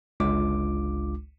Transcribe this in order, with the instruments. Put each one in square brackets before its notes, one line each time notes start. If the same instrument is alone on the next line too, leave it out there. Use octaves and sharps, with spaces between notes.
[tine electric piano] G1 C#2 G#3 D4 F4 D6